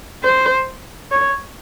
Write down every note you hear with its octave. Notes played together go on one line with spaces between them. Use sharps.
C5
C#5